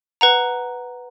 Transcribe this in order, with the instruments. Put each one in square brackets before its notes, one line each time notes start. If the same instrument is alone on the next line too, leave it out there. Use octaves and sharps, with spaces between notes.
[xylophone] B4 F#5 A#5